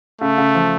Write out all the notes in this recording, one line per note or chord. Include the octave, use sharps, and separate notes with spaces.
C#3 A3
C#3
F3